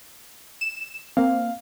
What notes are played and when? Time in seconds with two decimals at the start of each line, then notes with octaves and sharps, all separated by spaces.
0.61 E7
1.17 A#3 C4 F5